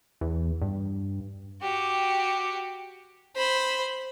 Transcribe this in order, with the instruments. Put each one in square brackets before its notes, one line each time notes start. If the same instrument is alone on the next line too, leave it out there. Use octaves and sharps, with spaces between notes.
[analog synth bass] E2
G2
[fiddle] F#4 G4
C5 B5